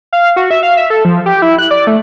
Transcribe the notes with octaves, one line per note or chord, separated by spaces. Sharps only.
F5
F#4
E5
F5
E5
A4
F3
G4
E4
F#6
D5
A3